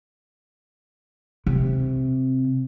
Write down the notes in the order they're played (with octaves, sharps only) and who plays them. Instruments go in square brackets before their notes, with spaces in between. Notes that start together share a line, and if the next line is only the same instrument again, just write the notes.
[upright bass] C3